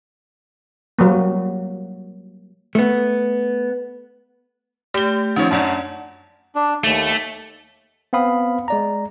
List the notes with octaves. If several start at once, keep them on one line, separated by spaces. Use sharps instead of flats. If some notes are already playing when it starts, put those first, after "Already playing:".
F#3 G3 A#3
A3 B3
A3 G4 G7
D#3 F3 C#4 C#5
F#2 D4 C#5 D5 F#5 A5
D4
D#2 A3
B3 C4 F5 B5 D#6
G#3 D5 A#5